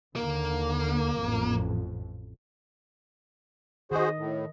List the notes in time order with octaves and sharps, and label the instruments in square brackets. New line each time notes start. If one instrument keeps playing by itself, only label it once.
[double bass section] D#2 D3 [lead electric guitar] A#3
[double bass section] A1 F2
[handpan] D#3 D#5 [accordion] F#4 G#4 C5
[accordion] A2